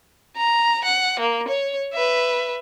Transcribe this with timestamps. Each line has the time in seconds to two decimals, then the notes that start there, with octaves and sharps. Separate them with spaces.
0.36 A#5
0.84 F#5
1.20 A#3
1.48 C#5
1.94 B4 E5